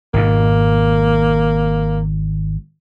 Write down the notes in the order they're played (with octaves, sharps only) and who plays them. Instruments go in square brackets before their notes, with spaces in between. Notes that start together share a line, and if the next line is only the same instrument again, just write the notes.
[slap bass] G#1 G#2 B2 [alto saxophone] A#3